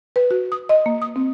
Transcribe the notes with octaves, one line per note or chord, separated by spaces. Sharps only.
B4
F#4
D#6
D#5
A#3
D#6
C4